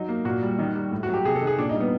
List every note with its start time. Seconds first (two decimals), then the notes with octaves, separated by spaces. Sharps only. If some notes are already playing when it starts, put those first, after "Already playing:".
Already playing: F#3 D#4
0.09 A#3
0.25 A#2 F#4
0.42 G3
0.59 D#3
0.75 G3
0.91 A2
1.03 F#4
1.09 F#3 G4
1.25 C3 G#4
1.35 A4
1.42 D#3
1.47 G#4
1.58 A#2 D4
1.69 D#4
1.75 G3
1.80 B3